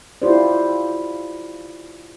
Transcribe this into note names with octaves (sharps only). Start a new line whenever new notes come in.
E4 F4 G4 C5 D5